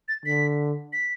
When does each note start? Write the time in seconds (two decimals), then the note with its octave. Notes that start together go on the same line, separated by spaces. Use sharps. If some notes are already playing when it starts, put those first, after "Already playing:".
0.08 A6
0.25 D3 B6
0.93 B6